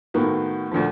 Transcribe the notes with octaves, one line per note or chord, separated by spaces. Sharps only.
A2 D#3 A#3 B3 F#4
D2 A#2 D3 F3